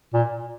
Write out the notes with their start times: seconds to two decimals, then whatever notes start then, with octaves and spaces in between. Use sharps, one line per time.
0.14 A#2